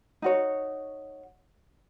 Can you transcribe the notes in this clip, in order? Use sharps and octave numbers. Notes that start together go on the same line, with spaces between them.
D#4 F#4 C#5